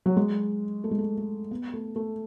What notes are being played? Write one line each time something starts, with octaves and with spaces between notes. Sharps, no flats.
F#3
G#3
A3
G#3
A3
A3
B3
A3
A3